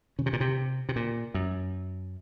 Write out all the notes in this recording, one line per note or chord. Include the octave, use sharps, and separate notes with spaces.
C#3
C3
A#2
C3
C3
A#2
F#2